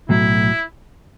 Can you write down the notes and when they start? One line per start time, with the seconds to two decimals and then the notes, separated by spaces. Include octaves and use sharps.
0.09 B1 A2 F#3 E4